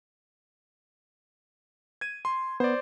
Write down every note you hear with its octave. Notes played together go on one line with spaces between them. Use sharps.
G#6 D#7
C6
B3 C5 D5